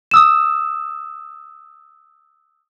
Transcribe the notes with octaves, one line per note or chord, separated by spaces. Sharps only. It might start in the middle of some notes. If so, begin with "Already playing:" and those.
D#6 E6 E7